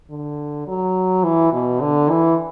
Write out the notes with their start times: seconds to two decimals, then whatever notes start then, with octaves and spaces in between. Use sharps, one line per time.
0.10 D3
0.67 F#3
1.24 E3
1.53 B2
1.81 D3
2.09 E3